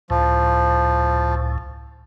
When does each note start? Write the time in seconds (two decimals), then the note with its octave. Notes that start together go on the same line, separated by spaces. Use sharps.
0.10 C#2 A2 F3